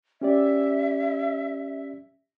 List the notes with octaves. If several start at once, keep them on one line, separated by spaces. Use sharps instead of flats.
C#4 G4 D5 E5